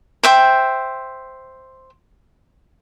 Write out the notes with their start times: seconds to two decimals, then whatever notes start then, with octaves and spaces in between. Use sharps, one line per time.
0.23 C5 E5 G5